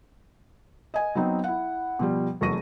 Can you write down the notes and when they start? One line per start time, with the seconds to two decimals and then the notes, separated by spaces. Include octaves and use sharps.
0.94 D#5 G#5
1.15 F#3 B3 C4 D#4
1.44 E4 F#5
1.99 B2 F3 G3
2.41 F1 E2 F#3 C#6 A#6 D#7